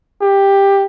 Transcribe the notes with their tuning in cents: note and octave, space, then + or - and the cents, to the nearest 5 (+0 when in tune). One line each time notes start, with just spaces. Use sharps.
G4 +10